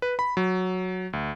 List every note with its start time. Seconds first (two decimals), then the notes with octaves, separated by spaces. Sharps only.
0.02 B4
0.19 B5
0.37 F#3
1.13 D2